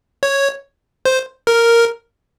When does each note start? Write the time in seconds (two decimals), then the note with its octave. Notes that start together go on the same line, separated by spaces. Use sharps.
0.23 C#5
1.05 C5
1.47 A#4